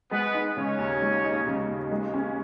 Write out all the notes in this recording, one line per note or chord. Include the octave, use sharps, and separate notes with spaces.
G#3 B3 B4
D#4
C#3 C#4 C#5
D#2
G#3
D#4
C#3
D#2
G#3
C#4